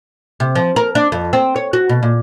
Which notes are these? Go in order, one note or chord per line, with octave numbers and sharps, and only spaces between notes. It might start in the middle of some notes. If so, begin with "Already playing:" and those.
C3
F3
A#4
D4
F2
C4
C#5
F#4
B2
A#2